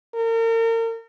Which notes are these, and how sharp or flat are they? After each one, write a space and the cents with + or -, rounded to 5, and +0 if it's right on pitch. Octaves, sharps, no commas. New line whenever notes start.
A#4 -35